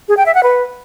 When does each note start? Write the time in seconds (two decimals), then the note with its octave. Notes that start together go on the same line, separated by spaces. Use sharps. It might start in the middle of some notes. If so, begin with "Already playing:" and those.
0.08 G#4
0.17 G5
0.26 E5
0.34 F#5
0.43 B4